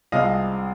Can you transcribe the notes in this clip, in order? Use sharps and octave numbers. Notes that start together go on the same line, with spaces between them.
C2 C3 F3 G#3 D#5 F5